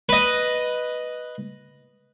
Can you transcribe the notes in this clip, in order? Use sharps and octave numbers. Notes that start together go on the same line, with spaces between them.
B4 D#5